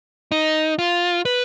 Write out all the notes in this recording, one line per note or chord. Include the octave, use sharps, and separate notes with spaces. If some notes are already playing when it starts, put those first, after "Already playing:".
D#4
F4
B4